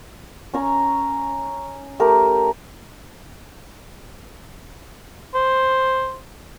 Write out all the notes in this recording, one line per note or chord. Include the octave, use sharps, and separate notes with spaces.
C#4 A#5 C#6
A3 G4 A#4
C5